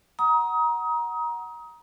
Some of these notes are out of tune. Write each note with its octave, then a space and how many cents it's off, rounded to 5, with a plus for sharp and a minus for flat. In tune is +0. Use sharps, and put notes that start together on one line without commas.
F#5 +0 A#5 +20 D#6 +25